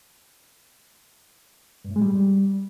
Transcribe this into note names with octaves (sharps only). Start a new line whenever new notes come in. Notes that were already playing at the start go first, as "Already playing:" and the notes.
G2
A2
G#3
G3